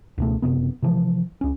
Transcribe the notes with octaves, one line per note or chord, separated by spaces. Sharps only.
C#2 B2 A3
F#1 G2 C3 B3
C3 E3 F3
C#2 C#4